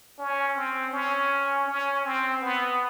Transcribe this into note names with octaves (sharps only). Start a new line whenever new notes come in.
C#4
C4
C#4
C#4
C4
B3